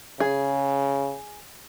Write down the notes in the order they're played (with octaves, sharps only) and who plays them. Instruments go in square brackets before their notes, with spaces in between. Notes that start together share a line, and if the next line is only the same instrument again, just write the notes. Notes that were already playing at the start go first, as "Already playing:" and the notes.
[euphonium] C#3 [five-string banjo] G#4